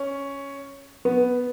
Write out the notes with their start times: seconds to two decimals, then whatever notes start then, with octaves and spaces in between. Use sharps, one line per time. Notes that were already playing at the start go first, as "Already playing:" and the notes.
Already playing: C#4
1.05 B3